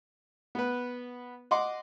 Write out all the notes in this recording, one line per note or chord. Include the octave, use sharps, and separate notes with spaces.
B3 B4
D#5 F#5 C6 D6